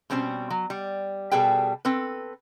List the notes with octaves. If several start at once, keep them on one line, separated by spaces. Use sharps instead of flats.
B2 G3 C4 C#4 C5
F#3
G3
B2 G3 G#4 A4 B4 G5
C4 A4 B4